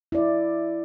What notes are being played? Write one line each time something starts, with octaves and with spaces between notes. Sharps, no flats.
E4 D5